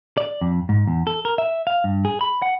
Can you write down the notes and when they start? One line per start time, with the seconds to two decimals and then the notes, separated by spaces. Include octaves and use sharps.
0.17 D5
0.41 F2
0.69 G#2
0.87 E2
1.07 A4
1.25 A#4
1.38 E5
1.67 F5
1.84 G2
2.05 G#4
2.21 B5
2.42 F#5